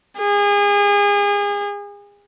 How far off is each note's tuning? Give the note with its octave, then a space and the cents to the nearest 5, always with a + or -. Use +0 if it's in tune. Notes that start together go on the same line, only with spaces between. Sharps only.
G#4 -35